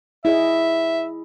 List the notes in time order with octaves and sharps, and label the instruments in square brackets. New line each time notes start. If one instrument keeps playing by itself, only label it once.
[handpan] E4 G#4 D#5 [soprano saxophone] E5